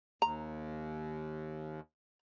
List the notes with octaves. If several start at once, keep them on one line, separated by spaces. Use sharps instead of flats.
D#2 A#5